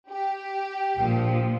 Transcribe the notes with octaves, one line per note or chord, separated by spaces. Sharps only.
G4
A#1 A#2 F3